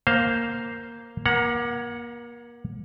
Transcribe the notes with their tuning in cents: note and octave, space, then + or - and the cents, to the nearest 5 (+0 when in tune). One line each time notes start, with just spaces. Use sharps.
A#3 +0 C5 +0 F5 +0
A#3 +30 F#5 -5 A#5 +0